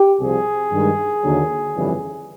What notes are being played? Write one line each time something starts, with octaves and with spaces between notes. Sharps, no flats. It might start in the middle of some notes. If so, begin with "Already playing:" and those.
Already playing: G4
C2 C3 F3 G#4
G2 D#3 G#3
D#2 D3 F#3
G1 F2 C#3 E3 G3